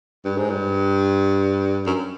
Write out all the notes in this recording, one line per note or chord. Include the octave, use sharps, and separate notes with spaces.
G2
G#2
G2
F#2